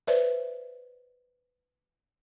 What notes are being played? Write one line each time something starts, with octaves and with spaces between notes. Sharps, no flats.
B4 C5 D5 E5